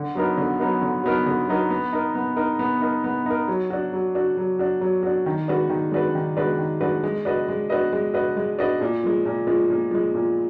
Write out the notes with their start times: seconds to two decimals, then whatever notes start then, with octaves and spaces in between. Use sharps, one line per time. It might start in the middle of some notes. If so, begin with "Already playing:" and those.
Already playing: D3
0.15 F#3 B3 D#4 A#4
0.38 D3
0.60 F#3 B3 D#4 A#4
0.82 D3
1.04 F#3 B3 D#4 A#4
1.26 D3
1.48 F#3 B3 D#4 A#4
1.70 B3
1.93 D#4 A#4
2.15 B3
2.36 D#4 A#4
2.59 B3
2.81 D#4 A#4
3.04 B3
3.26 D#4 A#4
3.48 F#3
3.70 D4 F#4
3.93 F#3
4.15 D4 F#4
4.37 F#3
4.59 D4 F#4
4.81 F#3
5.03 D4 F#4
5.26 D#3
5.48 G#3 D4 F#4 B4
5.70 D#3
5.92 G#3 D4 F#4 B4
6.15 D#3
6.37 G#3 D4 F#4 B4
6.59 D#3
6.81 G#3 D4 F#4 B4
7.03 G#3
7.25 D4 F#4 B4 D#5
7.48 G#3
7.70 D4 F#4 B4 D#5
7.93 G#3
8.14 D4 F#4 B4 D#5
8.37 G#3
8.59 D4 F#4 B4 D#5
8.81 A#2
9.04 F3 G#3
9.25 A#2
9.47 F3 G#3
9.70 A#2
9.91 F3 G#3
10.14 A#2